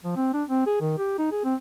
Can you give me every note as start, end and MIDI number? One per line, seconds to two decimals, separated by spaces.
0.04 0.16 53
0.17 0.32 60
0.33 0.44 62
0.49 0.66 60
0.66 0.77 68
0.81 0.95 51
0.98 1.17 67
1.18 1.28 63
1.32 1.42 68
1.44 1.55 60